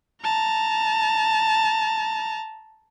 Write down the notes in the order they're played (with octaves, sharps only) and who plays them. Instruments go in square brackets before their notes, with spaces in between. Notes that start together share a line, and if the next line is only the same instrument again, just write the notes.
[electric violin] A5 A#5